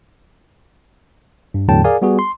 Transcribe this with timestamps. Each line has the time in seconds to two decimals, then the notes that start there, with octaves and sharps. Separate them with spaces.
1.54 G2
1.68 E2 A2 D3 F#3 G5 A5
1.84 G#4 A#4 D5 F5 G#5
2.02 G3 B3 F#4 G#4
2.19 C6